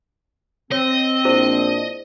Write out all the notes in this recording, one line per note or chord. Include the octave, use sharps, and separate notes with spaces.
C4 C#5 D#5
A#1 D4 E4 G#4 C5